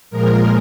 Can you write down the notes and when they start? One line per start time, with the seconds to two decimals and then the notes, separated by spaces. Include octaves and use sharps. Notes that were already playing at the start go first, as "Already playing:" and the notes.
0.10 A#2 F3 G#3 A#4